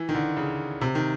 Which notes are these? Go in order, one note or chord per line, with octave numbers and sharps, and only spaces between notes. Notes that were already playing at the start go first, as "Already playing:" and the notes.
Already playing: E3
D#3
D3
C#3
C3
D#3